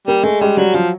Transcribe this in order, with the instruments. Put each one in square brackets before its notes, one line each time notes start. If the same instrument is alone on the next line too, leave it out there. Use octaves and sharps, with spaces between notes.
[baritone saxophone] G3 [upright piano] A#3
[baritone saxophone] G#3 [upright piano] A3
[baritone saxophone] G3 [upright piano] G#3
[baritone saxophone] F#3 [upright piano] G3
[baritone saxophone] F3 [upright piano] F#3